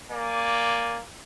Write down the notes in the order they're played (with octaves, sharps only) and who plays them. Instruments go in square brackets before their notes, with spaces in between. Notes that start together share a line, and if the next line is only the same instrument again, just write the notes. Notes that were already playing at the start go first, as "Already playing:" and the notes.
[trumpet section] A#3 D5 G#5